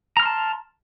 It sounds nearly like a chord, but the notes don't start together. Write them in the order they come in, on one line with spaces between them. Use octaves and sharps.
A#5 F6 C6 A5